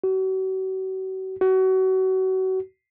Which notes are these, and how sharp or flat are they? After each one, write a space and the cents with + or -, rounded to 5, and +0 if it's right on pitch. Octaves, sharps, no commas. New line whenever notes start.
F#4 +40
F#4 +30